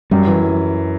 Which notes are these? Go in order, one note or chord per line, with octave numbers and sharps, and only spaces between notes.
F#2 G3
E3